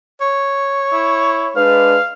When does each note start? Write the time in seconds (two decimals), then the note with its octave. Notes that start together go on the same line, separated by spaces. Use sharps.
0.21 C#5
0.92 E4
1.56 G#3 D4 B4 F5